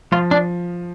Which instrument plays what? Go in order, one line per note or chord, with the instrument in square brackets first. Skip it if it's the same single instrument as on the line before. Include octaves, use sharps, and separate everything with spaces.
[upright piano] F3 [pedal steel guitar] F4
[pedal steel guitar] D4